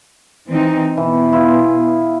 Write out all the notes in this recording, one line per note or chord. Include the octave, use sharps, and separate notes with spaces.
E3 C4 D#4
B2 E3
E4 F4 G#4